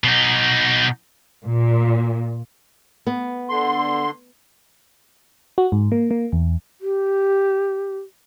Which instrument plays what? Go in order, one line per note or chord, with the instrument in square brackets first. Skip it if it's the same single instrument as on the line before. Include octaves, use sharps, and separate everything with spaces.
[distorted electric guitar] B2 D#4
[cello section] A#2
[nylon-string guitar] B3
[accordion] D3 C6
[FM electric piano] F#4
G#2
A#3
A#3
E2
[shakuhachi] G4